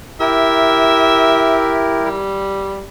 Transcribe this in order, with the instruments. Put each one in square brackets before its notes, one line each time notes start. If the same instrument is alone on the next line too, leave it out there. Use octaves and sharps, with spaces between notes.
[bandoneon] E4 G4 A#4 [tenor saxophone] E5
[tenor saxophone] G3